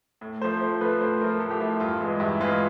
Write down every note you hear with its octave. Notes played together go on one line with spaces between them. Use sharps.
A2
F3 A3 C5
A2 C5
F3 A3 B4
A2 C5
F3 A3 A#4
A2 A4
G4
F3 A3 E4
G2 F4
E3 G#3
G2 E4
E3 G#3 F4